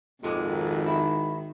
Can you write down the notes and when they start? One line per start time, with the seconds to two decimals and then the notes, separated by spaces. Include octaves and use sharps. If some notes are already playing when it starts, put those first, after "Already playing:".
0.23 G#1 F2 A#2 D#3 G#3
0.86 E4